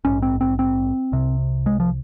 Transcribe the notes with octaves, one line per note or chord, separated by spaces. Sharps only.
A#1 G#2 C#4
C4
C4
C4
C2 C3
G#3
F3